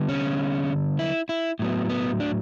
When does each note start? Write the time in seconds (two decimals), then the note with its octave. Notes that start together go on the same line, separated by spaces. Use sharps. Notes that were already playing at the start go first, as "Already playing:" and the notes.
Already playing: D3 G3 B3
0.09 C#4
0.99 E4
1.29 E4
1.59 A2 F#3 B3
1.89 B3
2.20 D4